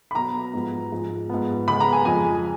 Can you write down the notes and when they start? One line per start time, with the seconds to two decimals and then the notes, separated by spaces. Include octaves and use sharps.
0.11 B5
0.15 B2 F#3 B3 A#5
0.54 G#2 F3 B3
0.92 G#2 F3 G#3
1.30 G#2 F3 B3
1.67 C#3 G#3 B3 B5
1.80 A#5
1.93 G#5
2.05 F2 F3 G#3 G#5